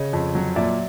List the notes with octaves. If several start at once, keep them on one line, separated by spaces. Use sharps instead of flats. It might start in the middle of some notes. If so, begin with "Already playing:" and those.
Already playing: C#3 C#5 D#5
F2
F#3
A#2 D5 E5